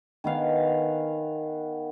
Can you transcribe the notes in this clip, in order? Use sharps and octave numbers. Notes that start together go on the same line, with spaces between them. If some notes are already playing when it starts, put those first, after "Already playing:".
D#3 B3 F5 G#5